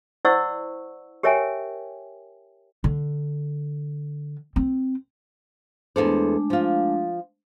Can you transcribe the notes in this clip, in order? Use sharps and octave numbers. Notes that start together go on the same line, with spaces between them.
E4 C5 D5 F#5 C#6 E6
G4 A#4 C#5 E5 G5 G#5
D3
C4
E2 G#3 A3 D4 A4 C5
F3 F4